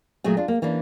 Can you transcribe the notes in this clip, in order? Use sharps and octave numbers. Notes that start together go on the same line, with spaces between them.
A#2 F#3 A3 G#4
D4 F4
A#3
E3 A#3 C#4 D4